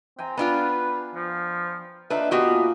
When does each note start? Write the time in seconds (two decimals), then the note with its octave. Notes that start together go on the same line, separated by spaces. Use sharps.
0.19 C4 G5 G#5 A#5
0.37 B3 D4 F4 B4
1.15 F3
2.10 D4 D#4 F4 A4 B4 E5
2.31 A#2 B3 F#4 G4 D#5 F5 G#5